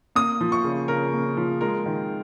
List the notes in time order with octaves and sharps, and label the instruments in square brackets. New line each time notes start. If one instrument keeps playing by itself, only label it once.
[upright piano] A#3 D#6
F3
C#6
C#3
C#3 A#4
A#3
F3
G#3 A#4
D#3